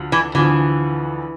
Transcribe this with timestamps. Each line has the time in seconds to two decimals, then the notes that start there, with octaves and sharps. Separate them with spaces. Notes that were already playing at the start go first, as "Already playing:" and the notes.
Already playing: D2 D3 F3
0.12 E3
0.34 D2 D3 E3 F3